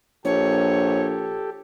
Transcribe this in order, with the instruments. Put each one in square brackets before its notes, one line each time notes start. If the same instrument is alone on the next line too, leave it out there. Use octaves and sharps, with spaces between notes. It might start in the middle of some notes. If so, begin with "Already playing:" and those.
[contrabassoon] A#1 [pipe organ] G4 A4 [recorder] C#5